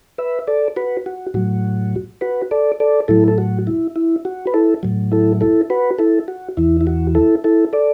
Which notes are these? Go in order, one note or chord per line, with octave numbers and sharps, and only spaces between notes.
B4 E5
A4 D5
F#4 B4
F#4
A2 F#3 F#4
F#4 B4
A4 D5
A4 D5
A2 F#3 E4 A4
A4
F#4
E4
E4
F#4
B4
E4 A4
A2 F#3
E4 A4
E4 A4
F#4 B4
E4 A4
F#4
E2 E3 E4
E4
F#4
E4 A4
E4 A4
A4 D5